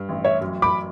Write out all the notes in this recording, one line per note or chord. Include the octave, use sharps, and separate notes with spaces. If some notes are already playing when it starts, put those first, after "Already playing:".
Already playing: G2
A1
C#5 E5
F#2
B5 D6